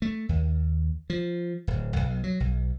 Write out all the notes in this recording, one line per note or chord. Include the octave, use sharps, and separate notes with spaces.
A3
D#2
F3
D1
B1
F#3
B1